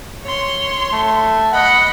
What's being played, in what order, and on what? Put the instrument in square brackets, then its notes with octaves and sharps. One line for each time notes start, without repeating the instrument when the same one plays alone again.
[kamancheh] C#5 C6
[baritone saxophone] A3
[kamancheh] D#5 B5 [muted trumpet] F#5